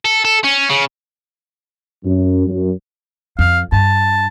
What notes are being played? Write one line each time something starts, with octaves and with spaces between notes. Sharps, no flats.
A4
A4
C#4
C#3
F#2
F#2
F2 F5
G2 A5